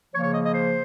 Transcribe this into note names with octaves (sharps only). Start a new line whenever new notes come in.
C#3 F3 A#3 C#5
C#5
D#5
D#5
C5